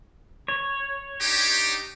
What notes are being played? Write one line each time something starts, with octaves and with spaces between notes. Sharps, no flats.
C#5
D4 D#4 G4